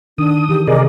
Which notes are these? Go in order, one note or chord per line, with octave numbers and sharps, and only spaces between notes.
D#3 D4 D#6
E3 G4 G#4
C3 G#4 A#4 D5 D#5